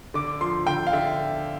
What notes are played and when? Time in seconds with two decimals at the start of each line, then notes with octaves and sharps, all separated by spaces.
0.14 D3 D6
0.41 F3 C6
0.67 D3 G5
0.87 F5
0.93 D3 E5